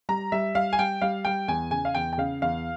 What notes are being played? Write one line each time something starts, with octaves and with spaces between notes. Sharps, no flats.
G3 A#5
G3 E5
G3 F5
G#5
G3 G5
G3 F5
G3 G5
E2 G#5
C#3 G#5
F5
E2 G5
G5
C#3 F5
E2 F5